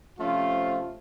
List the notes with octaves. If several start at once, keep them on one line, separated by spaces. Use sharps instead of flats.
C3 F3 A3 C#4 F4